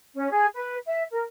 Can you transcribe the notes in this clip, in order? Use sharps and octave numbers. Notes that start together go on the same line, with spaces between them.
C#4
G#4
B4
E5
A#4